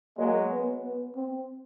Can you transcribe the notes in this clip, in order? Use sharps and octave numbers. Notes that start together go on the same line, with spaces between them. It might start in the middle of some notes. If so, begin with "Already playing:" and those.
F#3 G#3 A#3
B3
B3
C4